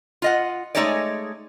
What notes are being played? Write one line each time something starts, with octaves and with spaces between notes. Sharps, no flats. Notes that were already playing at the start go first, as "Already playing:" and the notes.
F4 D#5 F#5
G#3 A3 D#4 G#4 C#5 D5